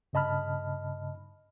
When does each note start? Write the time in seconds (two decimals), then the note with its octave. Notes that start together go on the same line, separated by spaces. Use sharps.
0.13 G2 C#3 D#5 A5 B5 F6